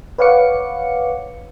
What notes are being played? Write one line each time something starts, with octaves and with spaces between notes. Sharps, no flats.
B4 C#5 F5 F#5 D6 C#7